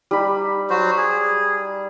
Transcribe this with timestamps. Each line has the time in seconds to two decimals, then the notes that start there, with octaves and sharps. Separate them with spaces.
0.11 G3 D#4 B5
0.70 F#3 F#4 C5
0.98 G#4